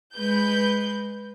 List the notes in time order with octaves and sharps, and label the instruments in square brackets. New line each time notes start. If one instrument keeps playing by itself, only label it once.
[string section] G#3 B4 G6